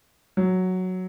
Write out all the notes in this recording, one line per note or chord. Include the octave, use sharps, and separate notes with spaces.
F#3